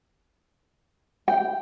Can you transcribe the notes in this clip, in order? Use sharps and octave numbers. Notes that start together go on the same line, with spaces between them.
G5